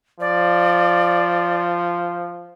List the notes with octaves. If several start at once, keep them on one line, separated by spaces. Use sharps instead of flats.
F3 D5